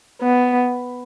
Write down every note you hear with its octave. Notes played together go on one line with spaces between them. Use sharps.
B3